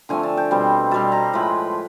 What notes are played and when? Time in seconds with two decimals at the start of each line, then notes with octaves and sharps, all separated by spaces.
0.09 D3 F3 A3 C4 G#5
0.23 A5
0.37 G5
0.51 B2 G3 C4
0.91 B2 G3 C4 A5
1.12 A#5
1.33 A2 F3 G#3 B5